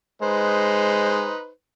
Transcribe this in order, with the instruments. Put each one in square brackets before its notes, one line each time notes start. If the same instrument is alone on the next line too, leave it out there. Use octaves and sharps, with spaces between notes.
[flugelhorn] G#3 [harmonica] D#4 B4 C5